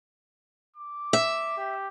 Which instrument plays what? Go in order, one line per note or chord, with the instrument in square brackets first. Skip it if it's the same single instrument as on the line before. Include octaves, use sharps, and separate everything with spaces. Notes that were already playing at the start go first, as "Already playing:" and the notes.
[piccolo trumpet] D6
[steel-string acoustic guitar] E5
[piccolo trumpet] G4